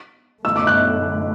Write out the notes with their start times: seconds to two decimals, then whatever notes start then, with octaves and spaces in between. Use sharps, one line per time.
0.44 F#2 D3 A3 E6
0.56 D6
0.67 F#6